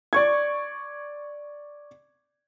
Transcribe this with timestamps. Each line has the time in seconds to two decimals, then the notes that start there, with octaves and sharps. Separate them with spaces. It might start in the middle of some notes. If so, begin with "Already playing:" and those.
0.13 D5 C#6 G#6